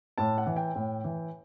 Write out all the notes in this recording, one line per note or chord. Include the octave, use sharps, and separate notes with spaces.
A2 A5
F#5
E3
G5
A2
E3